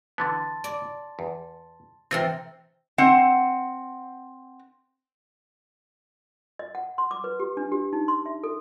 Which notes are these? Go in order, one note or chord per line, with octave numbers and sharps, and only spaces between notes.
D3 E3 B3 A5 C6 A6
D5
E2
C3 E3 C4 F4 A4 A#4 C5 G5
C4 F#5
D#5
F#5
C6
D6
B4
G4
D4
G4
D#4
C6
E5
A4